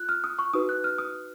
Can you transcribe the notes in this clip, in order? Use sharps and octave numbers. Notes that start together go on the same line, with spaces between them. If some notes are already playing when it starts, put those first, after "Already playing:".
Already playing: F4 F#6
F6
D#6
C#6
D#4 F#4 B4 D#6
F#6
F6
D#6